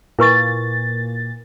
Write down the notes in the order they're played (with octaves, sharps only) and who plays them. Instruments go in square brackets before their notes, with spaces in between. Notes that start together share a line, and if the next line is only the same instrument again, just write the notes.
[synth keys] A#2 A6 [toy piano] E4 B4 C#6